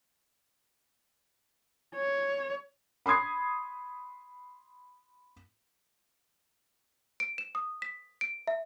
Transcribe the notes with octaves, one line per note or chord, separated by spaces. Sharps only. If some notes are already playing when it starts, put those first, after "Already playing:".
C#5
B5 C6 D#6 G#6 C7
D7
E7
D#6
B6
D7
E5